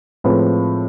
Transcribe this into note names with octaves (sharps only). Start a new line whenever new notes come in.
A2 F3 G#3 C4 F4 B4